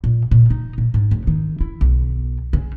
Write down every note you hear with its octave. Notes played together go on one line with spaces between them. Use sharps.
A#2
A#2
D#4
A#2
G#2
F1
D#3
E4
B1
C#3